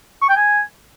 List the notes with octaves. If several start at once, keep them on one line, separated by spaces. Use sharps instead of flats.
C#6
G5
G#5